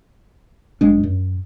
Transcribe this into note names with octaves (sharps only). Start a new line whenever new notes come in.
G1 F#2 G#3 D4
F#2